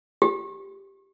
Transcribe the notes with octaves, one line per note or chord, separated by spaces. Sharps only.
G4